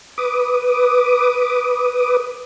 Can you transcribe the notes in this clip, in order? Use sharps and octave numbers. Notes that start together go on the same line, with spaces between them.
B4 D6 D#6